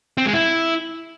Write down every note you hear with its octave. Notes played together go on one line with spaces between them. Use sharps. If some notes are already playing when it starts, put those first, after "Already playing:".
C4
G#3
E4